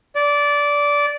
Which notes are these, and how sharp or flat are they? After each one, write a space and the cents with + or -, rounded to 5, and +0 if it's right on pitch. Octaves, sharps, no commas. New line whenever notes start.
D5 -15